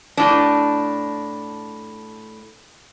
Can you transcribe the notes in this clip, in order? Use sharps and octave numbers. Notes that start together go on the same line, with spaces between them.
A2 D4